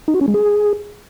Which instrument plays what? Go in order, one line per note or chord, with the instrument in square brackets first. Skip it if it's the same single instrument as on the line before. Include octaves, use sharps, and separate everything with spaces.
[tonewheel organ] D#4
F#4
C#4
G#3
G#4